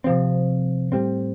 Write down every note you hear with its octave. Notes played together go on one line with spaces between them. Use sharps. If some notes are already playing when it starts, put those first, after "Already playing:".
C3 F3 C4
A2 G3 C4